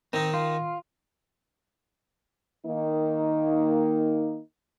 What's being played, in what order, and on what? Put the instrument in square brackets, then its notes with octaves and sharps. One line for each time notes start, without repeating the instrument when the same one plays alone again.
[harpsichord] D#3 D#4 [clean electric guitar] C4
[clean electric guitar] F4
[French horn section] D#3 A#3 D#4